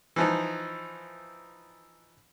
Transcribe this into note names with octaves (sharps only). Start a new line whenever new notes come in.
E3 F3 D#4